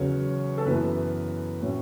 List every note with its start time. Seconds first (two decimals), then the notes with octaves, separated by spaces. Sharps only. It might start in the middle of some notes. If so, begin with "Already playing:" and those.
Already playing: E2 C#3 F#3 C#5
0.58 A4
0.65 F#2 E3 B3 B4
1.61 A2 F#3 C#4